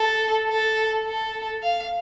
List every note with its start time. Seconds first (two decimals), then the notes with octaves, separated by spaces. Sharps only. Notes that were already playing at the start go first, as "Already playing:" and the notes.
Already playing: A4
0.48 A4
1.05 A4
1.63 F5